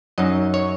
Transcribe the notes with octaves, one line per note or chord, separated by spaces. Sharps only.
F#2 F#3 D#4 D#5
C#5